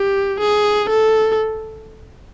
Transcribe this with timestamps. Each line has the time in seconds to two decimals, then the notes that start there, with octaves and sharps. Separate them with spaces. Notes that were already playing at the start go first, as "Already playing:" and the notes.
Already playing: G4
0.40 G#4
0.90 A4